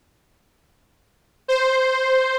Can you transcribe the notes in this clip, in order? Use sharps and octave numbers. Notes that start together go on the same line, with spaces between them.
C5